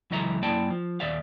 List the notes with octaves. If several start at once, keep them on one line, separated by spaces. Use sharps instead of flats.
C#2 E3 F#3 D#5 E5 A#5
F#2 A#3 E4 D5 G5 A5
F3
D#2 D5 E5 F5